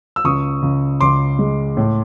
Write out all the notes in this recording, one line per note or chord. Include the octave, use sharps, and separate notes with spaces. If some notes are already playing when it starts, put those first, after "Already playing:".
E6
C#2 C#6 D#6
C#2
C#2 C6 D6
G#3
A2